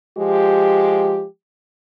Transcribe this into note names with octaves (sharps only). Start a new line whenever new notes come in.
F3 G#3 G4